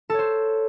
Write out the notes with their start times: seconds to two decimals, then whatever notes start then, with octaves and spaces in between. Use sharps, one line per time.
0.10 A4
0.14 C#5
0.19 C5